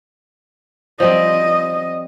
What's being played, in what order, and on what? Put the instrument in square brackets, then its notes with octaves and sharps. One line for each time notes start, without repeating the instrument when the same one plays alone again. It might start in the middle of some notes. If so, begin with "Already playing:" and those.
[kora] F3 G3 C4 [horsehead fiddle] D#5